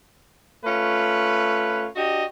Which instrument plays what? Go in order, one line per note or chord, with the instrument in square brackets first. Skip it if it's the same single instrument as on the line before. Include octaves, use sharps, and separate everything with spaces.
[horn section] A3 C#4 F4 B4
D4 F#4 G4 D#5